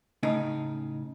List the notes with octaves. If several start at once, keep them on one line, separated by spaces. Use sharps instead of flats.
A2 C#3 D#4